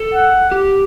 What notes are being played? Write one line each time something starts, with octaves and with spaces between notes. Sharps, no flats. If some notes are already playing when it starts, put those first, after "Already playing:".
Already playing: A4
F#5
G4